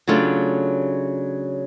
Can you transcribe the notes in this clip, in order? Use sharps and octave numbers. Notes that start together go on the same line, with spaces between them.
C#3 F#3 A3 D4 F4